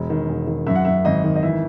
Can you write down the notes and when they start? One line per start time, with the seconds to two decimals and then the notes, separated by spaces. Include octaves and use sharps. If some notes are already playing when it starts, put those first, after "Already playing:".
Already playing: E1
0.10 D#3
0.29 E1
0.47 D#3
0.67 F#2 E5
0.75 F#5
0.85 F#2 E5
1.05 G#1 D#5
1.24 D#3
1.36 D#5
1.43 E3 E5